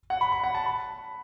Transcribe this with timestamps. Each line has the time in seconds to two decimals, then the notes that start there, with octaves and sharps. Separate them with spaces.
0.10 F#5
0.21 B5
0.32 B5
0.43 F#5
0.55 A5
0.66 B5